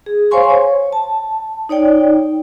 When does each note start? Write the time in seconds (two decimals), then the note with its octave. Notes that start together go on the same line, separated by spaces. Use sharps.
0.06 G#4
0.31 C5 C#5 F5 G#5 C6 C#6
0.49 C#5
0.93 A5
1.69 D#4 C#5 D5 G5